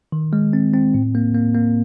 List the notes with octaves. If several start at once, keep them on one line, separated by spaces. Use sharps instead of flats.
D#3
G#3
C4
C4
A2
A#3
A#3
A#3